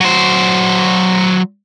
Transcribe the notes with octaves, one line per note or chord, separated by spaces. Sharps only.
F#3 C5